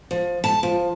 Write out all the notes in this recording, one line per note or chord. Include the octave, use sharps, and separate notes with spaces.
F3
A5
F3